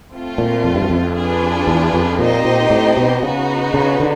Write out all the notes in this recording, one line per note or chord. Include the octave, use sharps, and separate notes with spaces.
A3 C4 F4
A#2
F2
G2
F#2
F2
D4 F4 G#4 B4
E2
F2
A#2 C4 D#4 G4 C5 D#5
A#2
A2
B2
C#3 B3 D#4 F#4 B4
C#3
D3